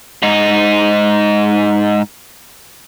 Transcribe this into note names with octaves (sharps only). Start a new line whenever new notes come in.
G#2 D#4